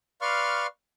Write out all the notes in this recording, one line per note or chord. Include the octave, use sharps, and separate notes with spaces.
B4 D5 F5 C6 C#6 F6